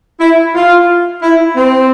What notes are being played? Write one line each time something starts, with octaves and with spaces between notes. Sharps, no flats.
E4
F4
E4
C4